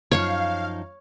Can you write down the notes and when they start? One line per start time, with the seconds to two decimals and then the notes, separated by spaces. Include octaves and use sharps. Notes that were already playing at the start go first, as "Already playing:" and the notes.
0.12 F#2 F3 D#4 C#5 F5